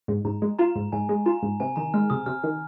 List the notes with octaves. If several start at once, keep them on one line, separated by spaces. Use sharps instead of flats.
G#2
G#2 A#5
G#3
F4 A#5
G#2
G#2 G#5
G#3
F4 A#5
G#2
C3 G#5
D#3 A#5
G#3 F6
C3 D#6
C3 F6
D#3